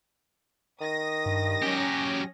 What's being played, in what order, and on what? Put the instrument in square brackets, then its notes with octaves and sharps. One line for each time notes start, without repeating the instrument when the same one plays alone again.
[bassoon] D#3 [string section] D#6 A#6
[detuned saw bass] G2
[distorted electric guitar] F#3 G4 [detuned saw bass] C#4